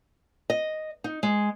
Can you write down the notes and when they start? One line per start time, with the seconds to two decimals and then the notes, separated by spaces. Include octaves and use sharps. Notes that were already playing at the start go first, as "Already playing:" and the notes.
0.50 D#5
1.04 D#4
1.23 G#3